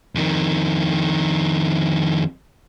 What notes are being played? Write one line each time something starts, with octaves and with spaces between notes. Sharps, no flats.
F2 D#3